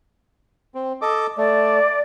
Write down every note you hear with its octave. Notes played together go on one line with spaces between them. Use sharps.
C4
A4 D#5 D6
A3 D5